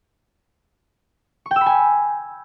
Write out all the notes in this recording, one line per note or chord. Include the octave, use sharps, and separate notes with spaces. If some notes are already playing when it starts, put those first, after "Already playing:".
C#6
G5
E6
B5
G#5